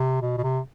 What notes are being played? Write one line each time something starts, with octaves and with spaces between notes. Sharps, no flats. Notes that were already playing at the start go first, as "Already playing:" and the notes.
Already playing: C3
B2
B2
C3